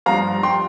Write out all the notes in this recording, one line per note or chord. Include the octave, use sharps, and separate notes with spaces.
G2 F3 F5 A#5
G5 C6